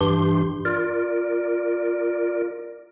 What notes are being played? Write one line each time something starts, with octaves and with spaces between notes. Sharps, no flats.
G2 E3 D4 G4 C6
F4 A#4 D5